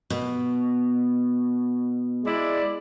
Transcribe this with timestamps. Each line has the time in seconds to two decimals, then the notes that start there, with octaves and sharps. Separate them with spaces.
0.10 B2
2.25 G#3 E4 D5